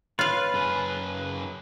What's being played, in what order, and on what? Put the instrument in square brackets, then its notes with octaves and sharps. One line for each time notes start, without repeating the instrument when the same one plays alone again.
[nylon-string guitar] D#4 C#5 [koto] F4 F5 [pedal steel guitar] B4
[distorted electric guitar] F#2 G#4